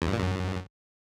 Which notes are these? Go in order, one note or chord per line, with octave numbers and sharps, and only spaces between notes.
E2
G2
A#2
F#2